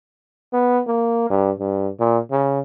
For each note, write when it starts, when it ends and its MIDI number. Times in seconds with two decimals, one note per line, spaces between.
0.53 0.80 59
0.87 1.25 58
1.30 1.51 43
1.60 1.89 43
2.00 2.19 46
2.31 2.60 49